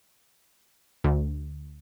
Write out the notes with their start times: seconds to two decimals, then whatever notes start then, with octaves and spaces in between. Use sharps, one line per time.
1.04 D2